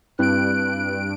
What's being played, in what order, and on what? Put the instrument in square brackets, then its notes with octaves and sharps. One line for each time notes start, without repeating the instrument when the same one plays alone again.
[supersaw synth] G2 D7 [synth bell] C4 E4 B4 [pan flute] F#6